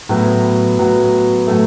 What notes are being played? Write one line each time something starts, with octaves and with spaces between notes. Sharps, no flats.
A2 F#3 B3 F#4
A2 F#3 B3 F#4
A2 F#3 A3